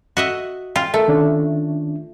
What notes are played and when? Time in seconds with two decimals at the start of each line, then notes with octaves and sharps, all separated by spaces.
0.17 F#4 D#5 E5
0.76 F4 G5
0.94 A3 A#4
1.08 D#3 C#4 D4